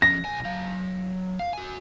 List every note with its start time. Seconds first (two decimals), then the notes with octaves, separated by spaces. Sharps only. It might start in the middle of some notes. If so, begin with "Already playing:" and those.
0.02 F3 C#4 A#6
0.25 B1 G#5
0.45 F#3 F5
1.39 F5
1.53 F#4 G#5